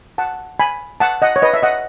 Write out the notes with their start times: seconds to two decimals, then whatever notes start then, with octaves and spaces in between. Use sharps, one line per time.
0.18 F#5 A5
0.60 G#5 B5
1.00 F#5 A5
1.22 D#5 F#5
1.36 C#5
1.42 B4 D#5
1.54 E5
1.63 D#5 F#5